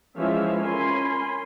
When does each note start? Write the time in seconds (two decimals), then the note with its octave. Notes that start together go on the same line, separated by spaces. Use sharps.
0.17 E3 F3 G#3 C#4 E5 F5
0.61 C#4 A#4 G#5 B5 C6